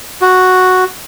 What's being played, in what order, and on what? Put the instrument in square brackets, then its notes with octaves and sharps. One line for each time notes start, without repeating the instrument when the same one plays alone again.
[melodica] F#4